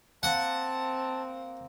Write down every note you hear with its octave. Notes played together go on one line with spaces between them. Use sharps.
A#3 C4 F#5 A5